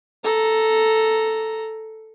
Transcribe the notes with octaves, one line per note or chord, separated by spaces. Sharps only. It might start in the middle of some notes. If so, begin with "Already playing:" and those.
A4 A#5